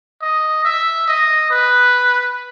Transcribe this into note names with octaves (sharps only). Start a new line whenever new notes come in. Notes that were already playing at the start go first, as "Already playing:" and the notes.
D#5
E5
D#5
B4